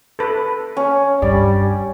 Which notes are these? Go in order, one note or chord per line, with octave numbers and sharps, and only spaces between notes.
A4 B4
C#4
G2 G3 D5